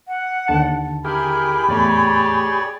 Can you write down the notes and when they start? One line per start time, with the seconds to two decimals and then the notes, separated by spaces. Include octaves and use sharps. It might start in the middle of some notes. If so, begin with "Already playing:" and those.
0.08 F#5
0.48 D#2 D3 A5
1.05 E4 G4 G#4 A#4 B5
1.69 E2 A2 A3 C#5 D5